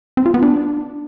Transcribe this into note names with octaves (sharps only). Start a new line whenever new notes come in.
C4
F4
B3
D4